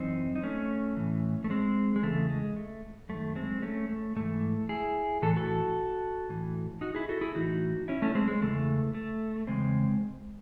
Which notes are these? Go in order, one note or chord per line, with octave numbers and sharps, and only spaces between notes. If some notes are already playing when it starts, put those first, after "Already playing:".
Already playing: F#2 E3 C4 D#4
D#4
A3 C#4
A2 E3
A3
G#3 C4
G#3
E2 C#3 E3 A3
G#3
A3
F#2 D#3 A3
G#3 C4
A3 C#4
A3
G#2 E3 A3
E4 G#4
A2 E3 A4
F#4 A4
A2 E3
D#4 F#4
E4 G#4
F#4 A4
E4 G#4
A2 E3 D#4 F#4
C#4 E4
A3 C#4
G#3 C4
G#3
E2 C#3 E3 A3
A3
E2 C#3 G#3 C4